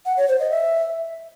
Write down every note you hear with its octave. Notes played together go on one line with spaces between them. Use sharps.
F#5
C#5
C5
D#5
E5